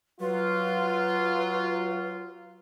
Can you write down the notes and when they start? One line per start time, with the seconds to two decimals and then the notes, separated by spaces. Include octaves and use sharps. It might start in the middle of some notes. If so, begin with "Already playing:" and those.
0.21 F#3 F4 B4